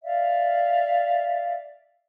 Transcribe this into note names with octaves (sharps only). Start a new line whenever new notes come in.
D5 E5 F5